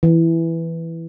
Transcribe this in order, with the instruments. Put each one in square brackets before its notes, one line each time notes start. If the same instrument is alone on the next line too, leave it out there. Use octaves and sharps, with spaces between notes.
[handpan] E3